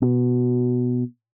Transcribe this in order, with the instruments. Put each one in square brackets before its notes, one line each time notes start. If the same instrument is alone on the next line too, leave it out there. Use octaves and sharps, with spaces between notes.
[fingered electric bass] B2